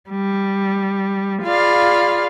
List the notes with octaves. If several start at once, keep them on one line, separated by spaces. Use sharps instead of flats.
G3
F4 G#4 D5 F5 B5